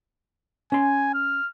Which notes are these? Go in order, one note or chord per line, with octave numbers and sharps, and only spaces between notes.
C#4 G#5 C6
F6